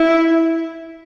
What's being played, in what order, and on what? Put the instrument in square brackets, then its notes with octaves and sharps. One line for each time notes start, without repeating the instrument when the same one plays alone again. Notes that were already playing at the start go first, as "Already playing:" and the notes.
Already playing: [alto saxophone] E4